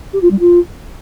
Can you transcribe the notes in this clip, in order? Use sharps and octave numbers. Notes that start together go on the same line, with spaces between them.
G4
F4
G3
F4